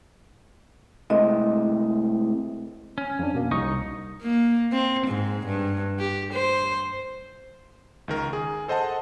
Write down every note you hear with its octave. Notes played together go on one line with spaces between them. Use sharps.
A2 C3 G#3 D#5
C#4
F2 D4
B2 A#3
C2 D#4 C#6 D#6
A#3
C4
G#2
G2
G4
C5
C#2 D#3 A#4
G#4
A4 C5 D#5 F#5 A5